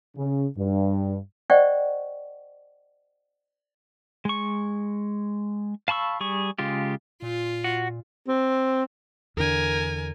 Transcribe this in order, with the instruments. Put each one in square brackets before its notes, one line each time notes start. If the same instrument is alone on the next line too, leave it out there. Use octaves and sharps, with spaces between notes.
[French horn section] C#3
G2
[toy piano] C5 D5 D#5 F#5 G5 C#6
[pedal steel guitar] G#3 C#6
F5 A5 B5 C#6 E6
G3 G#4 C#6
C#3 G#3 F4 G4
[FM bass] A#2 [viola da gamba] F4
[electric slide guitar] F#4
[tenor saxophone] C4
[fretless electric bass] E2 D3 [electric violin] A#4 G#5